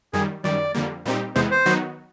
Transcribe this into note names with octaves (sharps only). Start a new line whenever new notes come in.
F#2 D#3 G3 G#4
F#2 D#3 G3 D5
F2 D3 G3 A#3
A#2 G3 C4 D#4 G4
E2 C3 E3 G#3 B3 C5
C5
D#3 F#3 B3 D#4 F#4